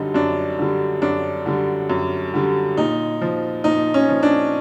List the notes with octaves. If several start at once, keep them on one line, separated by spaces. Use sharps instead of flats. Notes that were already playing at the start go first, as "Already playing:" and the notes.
Already playing: F#2 D3 G3 D#4
F#2 D4
D3 G3
F#2 D4
D3 G3
F#2
D3 G3
A#2 D#4
F3
A#2 D#4
C#4
F3
D4